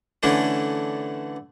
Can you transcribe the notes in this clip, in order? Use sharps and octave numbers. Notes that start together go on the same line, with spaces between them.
D3 E3 A3 C#4 D4